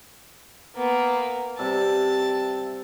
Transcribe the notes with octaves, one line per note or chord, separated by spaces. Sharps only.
A#3 B3
C3 G3 E5 A5